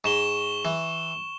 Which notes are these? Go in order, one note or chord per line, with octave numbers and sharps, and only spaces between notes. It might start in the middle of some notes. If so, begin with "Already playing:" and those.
G#2 C#6 E7 G7
E3